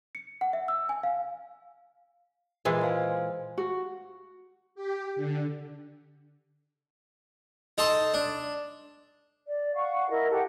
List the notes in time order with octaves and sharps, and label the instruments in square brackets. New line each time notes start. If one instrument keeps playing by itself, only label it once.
[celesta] C#7
F#5
E5
E6
G#5
F5
[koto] A#2 E3 G#3 [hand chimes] C5 D#5
[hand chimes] C5 F5 G#5
[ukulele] F#4
[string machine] G4
D3
[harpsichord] D#4 A4 A5 C6
D4
[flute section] D5
F5 F#5 C#6
E4 A#4 D#5
G4 A4 F#5